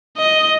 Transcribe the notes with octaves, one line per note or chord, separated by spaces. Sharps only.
D#5